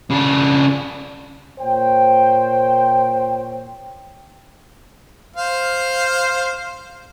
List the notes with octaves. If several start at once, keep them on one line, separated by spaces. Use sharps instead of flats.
C#3 D4
A#2 C5 C#5 G5
C5 F5